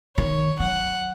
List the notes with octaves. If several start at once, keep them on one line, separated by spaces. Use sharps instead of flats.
D#3 C#5
F#3 F#5